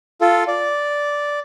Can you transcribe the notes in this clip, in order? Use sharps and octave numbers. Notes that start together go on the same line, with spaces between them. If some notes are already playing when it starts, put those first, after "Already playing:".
F4 A4
D5